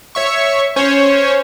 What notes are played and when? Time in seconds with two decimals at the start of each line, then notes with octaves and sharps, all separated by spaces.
0.15 C#5 E5 C#6
0.76 C#4 C5 C#5